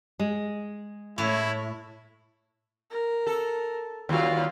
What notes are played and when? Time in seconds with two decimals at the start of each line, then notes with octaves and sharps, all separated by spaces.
0.19 G#3
1.18 A2 E4 C#5
2.90 A#4
3.27 A4
4.09 D#2 G3 F4 F#4 F5